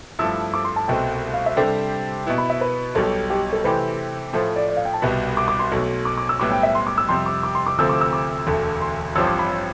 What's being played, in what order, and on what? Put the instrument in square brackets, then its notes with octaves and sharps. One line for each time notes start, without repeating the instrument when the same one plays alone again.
[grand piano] G2 F3 A3 E4 A4 [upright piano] E6
[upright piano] D6
C6
A5
[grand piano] C2 B2 A3 C4 [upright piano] G5
[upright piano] F5
E5
[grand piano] C3 G3 D4 G4 C5 [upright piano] A4
[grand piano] B2 B3 E4
[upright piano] B5
E5
B4
[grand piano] B1 B2 G3 [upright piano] A4
[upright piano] G4
A4
[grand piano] C3 E3 A3 C4 G4 [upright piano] B4
[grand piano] A2 F3 A3 [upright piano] C5
[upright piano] D5
D5
F5
G5
A5
[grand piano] C2 B2 G3 B3
[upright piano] D6
D6
C6
[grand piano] B1 B2 A3
[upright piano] D6
D6
E6
[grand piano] B1 A2 G3 B3 [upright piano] D6
[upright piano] G5
E5
C6
D6
E6
[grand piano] F2 C3 G3 [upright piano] C6
[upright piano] D6
D6
C6
D6
[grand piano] D2 C3 F3 A3 C4 [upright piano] E6
[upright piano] D6
E6
D6
[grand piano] E1 D2 D3 A3
[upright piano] C6
[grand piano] A1 G2 F3 C4 G4 [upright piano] E6
[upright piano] D6
B5